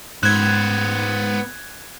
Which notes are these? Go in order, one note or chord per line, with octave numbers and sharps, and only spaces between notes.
G#2 B3 C5 F#6 G#6